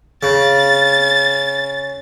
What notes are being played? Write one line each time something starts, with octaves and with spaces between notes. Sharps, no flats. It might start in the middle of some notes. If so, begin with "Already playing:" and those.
C#3 A6